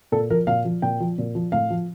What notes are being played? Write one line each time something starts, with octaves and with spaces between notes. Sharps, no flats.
A#2 A4
F3 A#4
A#2 F5
F3
A#2 G5
F3
A#2
F3
A2 F5
F3